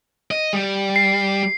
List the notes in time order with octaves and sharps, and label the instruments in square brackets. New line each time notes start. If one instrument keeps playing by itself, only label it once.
[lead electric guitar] D#5
G3
[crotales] C7